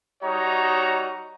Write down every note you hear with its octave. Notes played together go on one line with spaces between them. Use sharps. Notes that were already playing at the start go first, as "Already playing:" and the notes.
G3 D#4 F#4 C#5 D#5 A#5